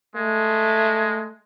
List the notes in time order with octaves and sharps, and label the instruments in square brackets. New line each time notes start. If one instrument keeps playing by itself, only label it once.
[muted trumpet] G#3 [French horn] A3